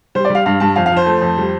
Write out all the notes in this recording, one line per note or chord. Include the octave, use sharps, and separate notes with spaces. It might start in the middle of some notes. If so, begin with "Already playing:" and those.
G3 C5
D5
G3
F5
G2 F5
G2 A5
F2 F5
F5
F3 C5
A3
F2
G3